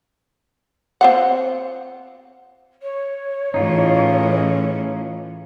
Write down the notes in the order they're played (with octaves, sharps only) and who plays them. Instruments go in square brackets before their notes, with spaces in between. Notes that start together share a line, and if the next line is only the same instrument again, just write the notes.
[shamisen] C4 F4 F#5
[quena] C#5
[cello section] A2 C#4 [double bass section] E3 [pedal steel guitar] D#4 F4 G#4